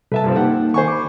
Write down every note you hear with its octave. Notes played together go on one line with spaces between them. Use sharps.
C3 G3 A4 B4 E5 A5
G2 F3 C4
A#3 D#4 G4 F#5
D#3 C5 G#5 C#6
B5 D6